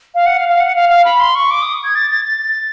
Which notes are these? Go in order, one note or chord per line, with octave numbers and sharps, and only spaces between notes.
F5
F#5
F5
F5
F#5
F5
F5
B5
C6
C#6
D6
D#6
G#6
A6
A6
A6